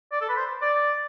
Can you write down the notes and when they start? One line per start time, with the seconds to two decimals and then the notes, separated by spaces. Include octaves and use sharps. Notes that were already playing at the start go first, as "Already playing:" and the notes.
0.12 D5
0.21 A4
0.29 B4
0.37 C5
0.62 D5